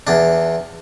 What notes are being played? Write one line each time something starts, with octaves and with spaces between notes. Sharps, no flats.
E2 D4